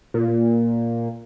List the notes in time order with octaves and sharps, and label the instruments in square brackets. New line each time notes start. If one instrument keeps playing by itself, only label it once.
[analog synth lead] A#2